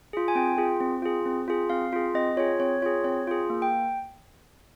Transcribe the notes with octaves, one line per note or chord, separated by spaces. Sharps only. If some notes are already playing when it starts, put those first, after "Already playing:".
F4 G#4
G#5
C4 G5
F4 G#4
C4
F4 G#4
C4
F4 G#4
C4 F5
F4 G#4
C4 D#5
F4 G#4 C#5
C4 C#5
F4 G#4 C#5
C4 C#5
F4 G#4
A#3
G5